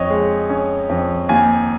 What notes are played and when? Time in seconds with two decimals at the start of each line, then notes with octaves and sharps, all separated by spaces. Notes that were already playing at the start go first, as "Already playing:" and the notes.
Already playing: F2 C#5 D#5
0.10 G#3
0.50 C#4
0.89 F2
1.29 D#2 G#5